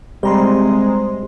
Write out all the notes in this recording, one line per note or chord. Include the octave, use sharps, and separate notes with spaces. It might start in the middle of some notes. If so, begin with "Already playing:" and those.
C3 G3 G#3 C5 A#5 C6